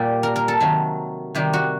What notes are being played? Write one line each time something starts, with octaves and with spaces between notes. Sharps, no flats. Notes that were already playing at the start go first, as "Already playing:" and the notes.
Already playing: A#2 G3 G4
A#4
A#4
A4
C3 D#3 F#3
C3 D#3 G3 G4
F#4